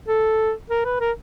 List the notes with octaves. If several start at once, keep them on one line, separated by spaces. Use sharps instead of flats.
A4
A#4
B4
A#4